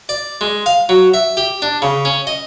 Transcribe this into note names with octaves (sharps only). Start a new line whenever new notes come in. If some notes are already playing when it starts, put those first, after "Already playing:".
D5
G#3
F5
F#3
E5
G4
D4
C#3
C#4
D#5